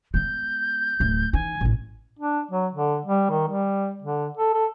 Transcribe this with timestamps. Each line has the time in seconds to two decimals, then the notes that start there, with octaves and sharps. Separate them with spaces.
0.14 G#3 B3 G6
1.00 D1 A3
1.33 E3 D#4 G#5
1.61 A1 A2
2.19 D4
2.51 F#3
2.72 D3
3.05 G3
3.30 D#3
3.48 G3
4.02 D3
4.37 A4
4.54 A4